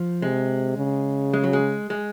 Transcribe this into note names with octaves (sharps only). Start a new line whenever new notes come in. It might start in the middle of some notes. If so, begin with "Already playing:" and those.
Already playing: F3
C3 G#3
C#3
G#3
F#3
G#3
G#3